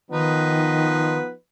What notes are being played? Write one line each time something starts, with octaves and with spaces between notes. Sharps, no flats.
D#3 F3 B3 D#4 B4